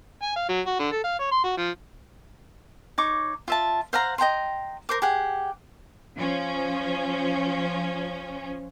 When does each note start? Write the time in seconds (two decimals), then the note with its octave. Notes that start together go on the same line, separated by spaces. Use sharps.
0.22 G#5
0.36 F5
0.49 F#3
0.67 F#4
0.79 D3
0.92 A4
1.04 F5
1.19 C#5
1.32 C6
1.44 F#4
1.57 F3
2.98 D#4 C#5 C#6 D6
3.48 F4 E5 A5
3.93 C5 F5 F#5 A#5
4.18 D#5 G5 A#5 C6
4.89 A#4 C5 D6
5.02 G4 G#4 F#5
6.18 F3 C#4